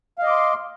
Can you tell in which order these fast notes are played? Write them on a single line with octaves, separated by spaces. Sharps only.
F5 D#5 D6 C6